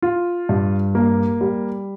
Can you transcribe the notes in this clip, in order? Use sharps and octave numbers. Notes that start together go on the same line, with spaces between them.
F4
G2
A#3
G3